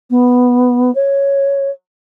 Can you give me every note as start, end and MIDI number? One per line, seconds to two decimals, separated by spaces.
0.10 0.93 59
0.95 1.71 73